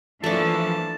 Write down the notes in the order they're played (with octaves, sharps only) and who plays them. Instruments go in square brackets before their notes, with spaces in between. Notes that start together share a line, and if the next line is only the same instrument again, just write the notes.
[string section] E3 F3 A#3 [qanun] A3 D4 [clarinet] A5